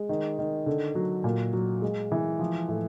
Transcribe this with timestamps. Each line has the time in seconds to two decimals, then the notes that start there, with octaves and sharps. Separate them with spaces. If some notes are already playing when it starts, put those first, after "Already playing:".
Already playing: G#3
0.09 D#3
0.39 D#3
0.66 D3
0.95 F#3
1.24 A#2
1.53 F#3
1.82 G#3
2.12 E3
2.39 F3
2.68 A2